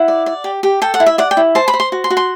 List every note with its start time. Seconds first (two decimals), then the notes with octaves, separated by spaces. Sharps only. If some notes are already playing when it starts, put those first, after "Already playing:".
Already playing: E4 F#5
0.08 D5
0.26 D5
0.44 G4
0.63 G4
0.82 A4 G5
0.94 F#5
1.00 E4
1.06 E5
1.18 D5 F#5
1.31 G5
1.37 E4
1.55 C5 A5
1.68 B5
1.74 C5
1.80 C6
1.92 F#4
2.04 C6
2.10 F#4
2.17 C6